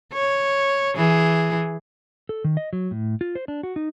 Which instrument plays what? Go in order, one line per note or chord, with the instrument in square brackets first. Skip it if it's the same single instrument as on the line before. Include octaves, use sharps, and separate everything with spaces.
[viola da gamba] C#5
E3 G#4
[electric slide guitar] A4
D#3
D#5
F#3
A2
F4
C5
D4
F#4
D#4